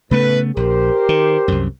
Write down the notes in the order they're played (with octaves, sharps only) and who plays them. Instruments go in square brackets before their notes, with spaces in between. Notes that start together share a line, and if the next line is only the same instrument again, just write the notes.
[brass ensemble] A2 B4 [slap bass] C#3 A3 B3
[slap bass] A#1 [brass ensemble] G4 A#4 C5
[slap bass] D#3
C2 F#2